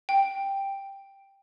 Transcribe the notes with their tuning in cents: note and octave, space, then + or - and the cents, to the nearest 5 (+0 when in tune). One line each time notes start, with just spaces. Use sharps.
G5 +5